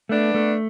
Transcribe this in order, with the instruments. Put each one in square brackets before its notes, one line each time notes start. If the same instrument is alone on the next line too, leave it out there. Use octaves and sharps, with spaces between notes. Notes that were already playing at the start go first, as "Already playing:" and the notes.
[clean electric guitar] A3 [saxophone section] B3 D4
[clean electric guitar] A3